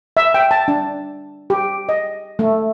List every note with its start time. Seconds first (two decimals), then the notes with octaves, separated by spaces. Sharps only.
0.17 E5
0.34 G5
0.51 A5
0.68 D4
1.50 G4
1.89 D#5
2.39 A3